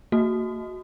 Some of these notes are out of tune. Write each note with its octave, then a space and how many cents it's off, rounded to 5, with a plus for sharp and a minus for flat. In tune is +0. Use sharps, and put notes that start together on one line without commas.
A#3 -40 F#4 +0